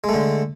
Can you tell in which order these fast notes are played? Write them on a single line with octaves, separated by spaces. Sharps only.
G#3 A3 D3